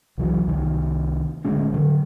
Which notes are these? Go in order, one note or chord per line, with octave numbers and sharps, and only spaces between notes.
C2 E3 F#3
C2 D#3
D1 D2 G#3 C#4
D3 F#3